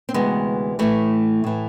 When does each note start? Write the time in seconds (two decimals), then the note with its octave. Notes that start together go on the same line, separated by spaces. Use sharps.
0.09 C4
0.14 D2 C3 E3 G#3 B3
0.79 A2 E3 A3
1.44 A2 E3